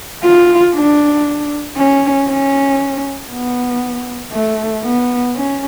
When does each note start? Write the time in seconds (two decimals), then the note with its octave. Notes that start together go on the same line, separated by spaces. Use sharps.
0.24 F4
0.75 D4
1.77 C#4
2.29 C#4
3.31 B3
4.33 A3
4.84 B3
5.35 C#4